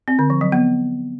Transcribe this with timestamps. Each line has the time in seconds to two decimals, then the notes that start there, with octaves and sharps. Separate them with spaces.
0.08 C4
0.19 D3
0.30 F3
0.41 F#3
0.52 B3